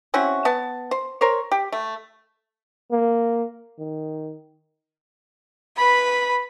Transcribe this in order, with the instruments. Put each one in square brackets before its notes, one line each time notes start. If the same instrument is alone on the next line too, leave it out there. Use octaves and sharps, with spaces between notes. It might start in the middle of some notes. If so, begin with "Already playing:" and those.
[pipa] C4 C#4 E4 F#4
B3 A5
C5
A#4 C5 C#5
G4
A3
[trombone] A#3
D#3
[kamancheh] B4 B5